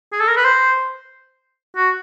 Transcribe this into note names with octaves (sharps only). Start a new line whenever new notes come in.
G#4
A4
A#4
B4
C5
F#4